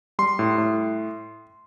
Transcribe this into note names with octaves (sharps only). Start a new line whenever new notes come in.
G3 C6
A2
A2